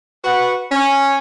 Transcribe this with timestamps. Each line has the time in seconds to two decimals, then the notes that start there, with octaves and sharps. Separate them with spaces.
0.24 F#4 B4 F#5
0.72 C#4